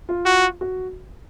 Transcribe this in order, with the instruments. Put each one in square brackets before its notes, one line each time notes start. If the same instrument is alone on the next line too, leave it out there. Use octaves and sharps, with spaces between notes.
[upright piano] F4
[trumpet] F#4
[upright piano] F#4